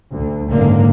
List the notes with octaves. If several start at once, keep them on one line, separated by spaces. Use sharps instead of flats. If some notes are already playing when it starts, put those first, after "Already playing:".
D2
F#1 G#2 D3 A#3